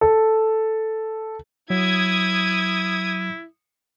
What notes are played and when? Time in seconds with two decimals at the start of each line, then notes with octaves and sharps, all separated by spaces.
0.01 A4
1.70 F#3 E4 D#6 G#6